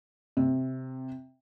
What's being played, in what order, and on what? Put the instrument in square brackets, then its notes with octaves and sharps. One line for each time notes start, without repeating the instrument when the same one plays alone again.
[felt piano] C3